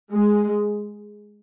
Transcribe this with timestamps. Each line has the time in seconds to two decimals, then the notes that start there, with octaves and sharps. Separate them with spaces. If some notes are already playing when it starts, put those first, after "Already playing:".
0.12 G#3